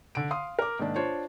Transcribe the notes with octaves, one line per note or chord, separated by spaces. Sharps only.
D3 D7
F5 C6 D#6
A#4 D6
G#2 D#3 A#3 D4
D4 F4 C5 C#5